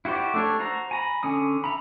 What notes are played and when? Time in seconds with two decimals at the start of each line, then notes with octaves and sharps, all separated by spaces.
0.05 E4 F#4 G4 C5 D5
0.34 A3 D4 C#5
0.59 F#4 C5 A#5
0.91 G#5 A#5 B5
1.23 D3 C#4 G#5 D#6
1.64 E5 A#5 B5